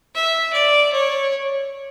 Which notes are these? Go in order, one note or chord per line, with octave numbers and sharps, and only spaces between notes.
E5
D5
C#5